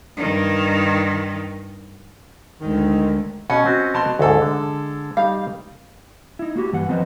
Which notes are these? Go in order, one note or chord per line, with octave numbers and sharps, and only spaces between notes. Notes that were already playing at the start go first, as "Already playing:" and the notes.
G2 D#3
D2 D#3 G#3
B2 C#4 D#5 F#5
C4 F#4
B2 A5 C6
D2 G#2 G#3 A4
D3
G3 D#4 F5
D#4 E4
A#3 F#4 G4
G2 E3 F#5
F3 B3 C4 B4 C5 D#5